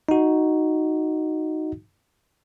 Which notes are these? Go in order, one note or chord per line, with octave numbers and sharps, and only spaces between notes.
D#4 F#4